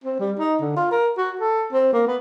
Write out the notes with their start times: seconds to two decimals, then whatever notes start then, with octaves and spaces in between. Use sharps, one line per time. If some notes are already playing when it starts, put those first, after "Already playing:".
0.04 C4
0.20 G3
0.39 D#4
0.61 D3
0.77 F4
0.92 A#4
1.17 F#4
1.40 A4
1.72 C4
1.93 A#3
2.07 B3